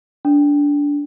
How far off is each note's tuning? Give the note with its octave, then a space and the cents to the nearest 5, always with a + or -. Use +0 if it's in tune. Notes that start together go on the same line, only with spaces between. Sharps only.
D4 -20